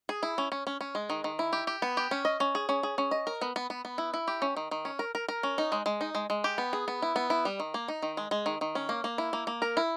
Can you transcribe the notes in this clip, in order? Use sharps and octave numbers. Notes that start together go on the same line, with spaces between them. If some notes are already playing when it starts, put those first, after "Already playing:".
G#4
E4
C#4
C#4
C#4
C#4
G#3
D#3
D#3
E4
G4
G4
B3
G4
C#4
D#5
C#4
G#4
C#4
G#4
C#4
D#5
A#4
B3
B3
B3
B3
E4
E4
G4
C#4
D#3
D#3
C#4
A#4
A#4
A#4
C#4
D#4
G#3
G#3
D#4
G#3
G#3
G4
B3
G#4
B3
E4
B3
E4
G3
D#3
A#3
D#4
D#3
G#3
G#3
D#3
D#3
C#4
A#3
A#3
E4
A#3
A#3
A#4
E4